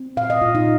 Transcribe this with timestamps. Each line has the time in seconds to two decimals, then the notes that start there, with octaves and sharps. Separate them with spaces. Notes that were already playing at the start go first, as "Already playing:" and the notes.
Already playing: C4
0.17 A#2 F5
0.30 D#5
0.42 A#2 F4
0.55 D#4